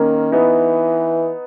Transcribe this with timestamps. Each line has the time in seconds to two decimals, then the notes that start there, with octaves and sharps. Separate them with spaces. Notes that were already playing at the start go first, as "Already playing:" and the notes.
Already playing: D#3 A#3 C#4
0.32 E3 B3 D#4